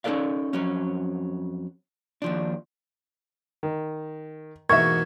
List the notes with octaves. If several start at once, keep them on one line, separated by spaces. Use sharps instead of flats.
C#4 D#4 F4 A4 D5 F5
F2 F#3 C#4
D#2 F3 D4
D#3
E2 G#2 B2 A#3 A#4 E5 C#6 G#6